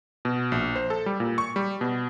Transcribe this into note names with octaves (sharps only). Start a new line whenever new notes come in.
B2
A#1
C5
A4
G3
A#2
C#6
G3
B2